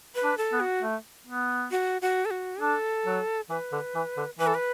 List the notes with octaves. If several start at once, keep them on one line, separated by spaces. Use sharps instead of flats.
B4
D4
A4
B3
F#4
A3
B3
F#4
F#4
A4
F#4
D4 A4
F#3
E3 B4
D3
E3
D3
E3 B4
A4
B4